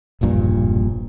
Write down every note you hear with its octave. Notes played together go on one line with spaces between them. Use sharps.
E1 A#1 G2 A#2